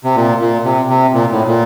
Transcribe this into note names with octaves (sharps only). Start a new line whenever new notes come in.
C3
A#2
A#2
C3
C3
A#2
A2
A#2